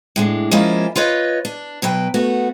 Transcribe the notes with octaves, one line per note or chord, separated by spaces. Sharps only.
A2 G#3 D4
F3 G#3 A#3 C#4 E4 F4
F4 B4 C#5 D#5
D4
B2 F#3 B4 G5
A3 B3 F#4